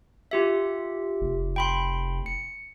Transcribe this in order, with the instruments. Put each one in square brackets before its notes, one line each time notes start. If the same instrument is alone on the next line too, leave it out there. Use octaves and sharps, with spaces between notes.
[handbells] F4 G4 E5
[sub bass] F1
[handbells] G5 B5 C6
C#7